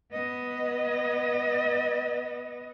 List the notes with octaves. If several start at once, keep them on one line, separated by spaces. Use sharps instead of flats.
B3 D#5